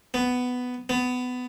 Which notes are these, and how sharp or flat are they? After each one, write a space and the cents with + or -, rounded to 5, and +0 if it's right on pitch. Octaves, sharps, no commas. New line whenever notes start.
B3 +10
B3 +20